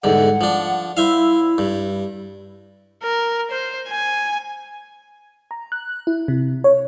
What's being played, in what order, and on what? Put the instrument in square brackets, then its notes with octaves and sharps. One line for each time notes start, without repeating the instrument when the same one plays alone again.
[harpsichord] E2 G#2 D3 [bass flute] F#5
[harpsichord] F3 D4
[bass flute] E4 [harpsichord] C5 E5 F5
[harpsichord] G2
[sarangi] A#4
C5
G#5
[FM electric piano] A#5
F#6
E4
C3
C#5